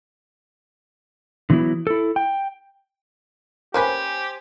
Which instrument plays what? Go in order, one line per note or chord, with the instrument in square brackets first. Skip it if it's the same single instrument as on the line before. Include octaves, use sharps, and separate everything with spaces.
[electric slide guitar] D3 E3 F#3 B3 E4
E4 A4
G5
[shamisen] A#3 C#4 B4 [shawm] G4 [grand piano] C5 G#5